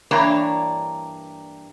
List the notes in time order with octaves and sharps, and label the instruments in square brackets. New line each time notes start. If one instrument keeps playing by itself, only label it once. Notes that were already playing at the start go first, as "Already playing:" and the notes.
[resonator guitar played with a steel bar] G2 E3 A#3 D4 C#5 A#5